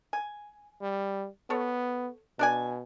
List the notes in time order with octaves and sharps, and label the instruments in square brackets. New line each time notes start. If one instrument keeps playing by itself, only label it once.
[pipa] G#5
[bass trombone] G3
[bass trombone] B3 [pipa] A4 C#5
[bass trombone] B2 [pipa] D4 D5 G#5